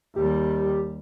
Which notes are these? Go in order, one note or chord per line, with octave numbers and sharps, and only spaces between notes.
D#2 G3 G4